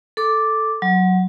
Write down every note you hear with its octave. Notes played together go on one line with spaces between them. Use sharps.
A4 D6
F#3